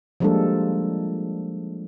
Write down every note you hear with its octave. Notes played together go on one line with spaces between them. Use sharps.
F3 G3 G#3 A#3 D4 A4